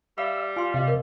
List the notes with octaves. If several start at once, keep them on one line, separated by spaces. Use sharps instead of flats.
G3 E5 F5 B5 D#6
F4 G#5 C6
C3 D#5 F5
A#4 D5 D#5